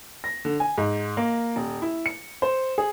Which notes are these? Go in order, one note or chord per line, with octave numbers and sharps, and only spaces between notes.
A#6
D3
G#5
G#2
A#3
D#1
E4
C#7
C5
G#4